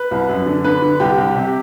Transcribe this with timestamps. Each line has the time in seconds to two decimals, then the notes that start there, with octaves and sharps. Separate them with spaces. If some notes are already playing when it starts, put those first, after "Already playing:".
Already playing: B4
0.11 C2
0.29 F#2
0.46 D3
0.64 D3 B4
0.82 D3
1.00 C2 G4
1.17 C2
1.35 C3